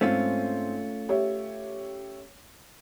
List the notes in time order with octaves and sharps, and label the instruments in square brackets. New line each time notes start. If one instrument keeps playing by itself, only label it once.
[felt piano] G#2 C4 [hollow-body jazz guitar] A3 C#4 F4
[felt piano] G4 C#5 E5